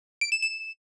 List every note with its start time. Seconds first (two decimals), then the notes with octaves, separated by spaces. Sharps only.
0.21 D7
0.32 E7
0.42 E7